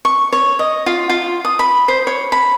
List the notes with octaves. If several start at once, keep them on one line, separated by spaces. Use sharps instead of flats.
C#6
C#5
D#5
F4
F4
D#6
B5
C5
C#5
B5